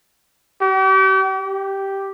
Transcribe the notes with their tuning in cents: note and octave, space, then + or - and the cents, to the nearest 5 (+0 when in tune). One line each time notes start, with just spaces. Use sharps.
G4 -40
G4 -5